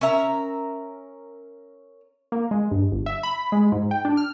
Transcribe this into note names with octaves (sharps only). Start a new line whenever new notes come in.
C#4 A#4 E5 A#5
A#3
G#3
G2
G1
E5
B5
G#3
G#2
G5
D4
F6